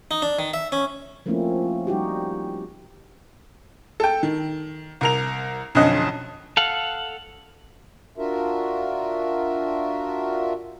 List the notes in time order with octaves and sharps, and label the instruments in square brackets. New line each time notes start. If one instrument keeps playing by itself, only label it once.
[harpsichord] D#4
D4
D#3
E5
C#4
[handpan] F3 A3 A#3 C4 C#4 E4
G3 D#4 F#4 G4
[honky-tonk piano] A4 G5
D#3
C2 A#4 F7
B1 F2 D3 C#4 D#5 F#6
[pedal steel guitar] A4 F5 F#5
[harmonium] D4 F4 F#4 A#4 E5